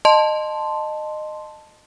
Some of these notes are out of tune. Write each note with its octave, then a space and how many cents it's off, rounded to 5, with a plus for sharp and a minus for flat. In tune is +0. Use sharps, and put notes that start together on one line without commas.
D#5 -20 A5 +0 C6 +0